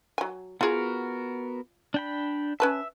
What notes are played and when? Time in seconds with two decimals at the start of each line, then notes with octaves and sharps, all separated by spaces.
0.18 F#3 G#5
0.61 B3 F4 F#4 G#4 A#4
1.94 D4 G5 B5
2.60 C#4 B4 E5 A5